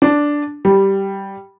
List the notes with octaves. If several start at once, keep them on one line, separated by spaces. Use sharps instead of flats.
D4
G3